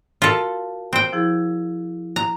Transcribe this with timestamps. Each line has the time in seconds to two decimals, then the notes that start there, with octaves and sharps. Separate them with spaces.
0.22 F4 F#4 A4 A#4
0.93 C4 G5
1.13 F3 E4 G#4
2.16 A#5